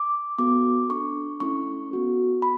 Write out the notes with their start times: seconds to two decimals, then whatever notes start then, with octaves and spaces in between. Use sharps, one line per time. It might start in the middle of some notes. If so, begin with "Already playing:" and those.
Already playing: D6
0.38 B3 F#4 A4 D6
0.89 D4 A4 C#6
1.40 A3 C#4 E4 A4 C#6
1.91 B3 F#4 A4
2.42 B3 B5